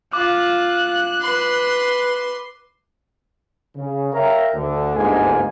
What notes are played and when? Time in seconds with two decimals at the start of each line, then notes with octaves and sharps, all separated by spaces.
0.13 F4 D6 F#6
1.21 B4 C6
3.75 C#3
4.13 A#4 C#5 E5 F5 G5 A#5
4.54 D2 D3
4.95 G1 D2 G#2 G#3 A#3 G#5